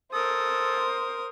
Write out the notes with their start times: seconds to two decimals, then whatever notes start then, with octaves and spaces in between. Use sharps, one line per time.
0.13 A4 A#4 C5 D#6